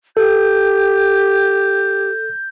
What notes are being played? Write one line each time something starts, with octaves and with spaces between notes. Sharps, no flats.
G4 A4 G6